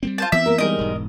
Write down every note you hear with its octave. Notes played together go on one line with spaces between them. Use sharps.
G3 A#3 C4
F4 C5 A5
E3 B3 C4 E5
A#3 A#4
G3 G#3 D#4 A#4 D#5
E1 G#2